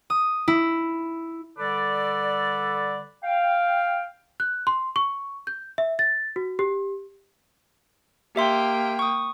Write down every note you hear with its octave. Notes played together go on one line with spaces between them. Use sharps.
D#6
E4
D3 G3 A4 B4 D5
F5 G5
F#6
C6
C#6
G6
E5
A6
F#4
G4
A#3 G4 E5 G5 C6
C#6 D#6